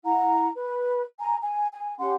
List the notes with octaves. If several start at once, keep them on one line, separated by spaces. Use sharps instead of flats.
E4 F#5 A#5
B4
G#5 A#5
G#5
G#5
C#4 G4 F#5 C6